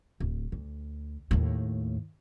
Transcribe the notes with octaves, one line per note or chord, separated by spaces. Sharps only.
D1
D2
D#2 A2